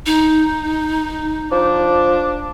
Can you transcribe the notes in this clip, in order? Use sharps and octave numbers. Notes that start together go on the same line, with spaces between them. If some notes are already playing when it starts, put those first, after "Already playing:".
D#4
F3 D4